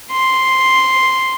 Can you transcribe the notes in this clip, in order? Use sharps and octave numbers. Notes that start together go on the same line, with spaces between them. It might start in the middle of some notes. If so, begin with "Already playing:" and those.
C6